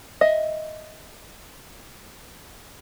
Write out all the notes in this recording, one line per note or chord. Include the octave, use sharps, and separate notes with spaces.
D#5 E5